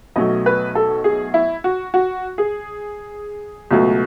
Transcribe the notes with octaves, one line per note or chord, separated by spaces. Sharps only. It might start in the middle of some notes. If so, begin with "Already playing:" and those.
B1 B2 F#3 A3 D#5
B4
A4
G#4
E4
F#4
F#4
G#4
C#2 B2 F#3 A3